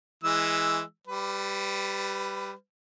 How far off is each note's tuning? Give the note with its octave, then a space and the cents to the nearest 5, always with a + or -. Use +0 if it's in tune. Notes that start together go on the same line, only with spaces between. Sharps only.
E3 -5 G#3 +0 E6 +0
G3 +0 B4 +20